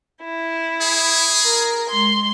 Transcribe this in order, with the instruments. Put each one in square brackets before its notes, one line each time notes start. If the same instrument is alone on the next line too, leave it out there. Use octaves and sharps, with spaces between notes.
[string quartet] E4
[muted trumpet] G#4
[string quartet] A#4
G#3 C6